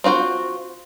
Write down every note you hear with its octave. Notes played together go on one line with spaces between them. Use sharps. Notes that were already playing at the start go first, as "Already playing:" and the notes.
C4 F4 F#4 C5